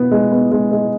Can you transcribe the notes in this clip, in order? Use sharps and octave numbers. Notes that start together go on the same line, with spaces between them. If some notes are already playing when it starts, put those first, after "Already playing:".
Already playing: B2 B3
G#3
B3
G#3
G#3